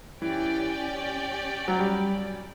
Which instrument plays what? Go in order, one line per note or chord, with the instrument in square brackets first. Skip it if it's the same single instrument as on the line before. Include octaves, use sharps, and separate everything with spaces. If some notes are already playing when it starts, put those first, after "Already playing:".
[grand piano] E3 [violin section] C#4 G4 D5 G5
[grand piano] F#3
G3